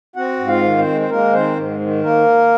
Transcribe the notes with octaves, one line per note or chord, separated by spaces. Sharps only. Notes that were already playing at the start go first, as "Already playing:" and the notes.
C4 F#4 F#5
G#2
F4 F5
D#3
C4 C5
G#3
C5
G#3 A#3 A#4
D#3 C4 C5
G#2
D#3
A#3 A#4